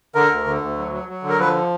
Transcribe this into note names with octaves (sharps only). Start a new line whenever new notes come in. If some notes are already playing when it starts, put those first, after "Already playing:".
D3 A#4
D2
D3
D2
F#3
F#3
F#3
D3
A#4
F3 B4